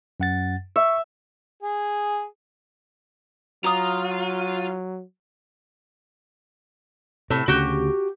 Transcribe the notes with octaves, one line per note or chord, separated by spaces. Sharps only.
F#2 F#5 A6
E5 C#6
G#4
F#3 F4 A#5 D#6
A2 C3 A4
D2 C#3 F#4 G4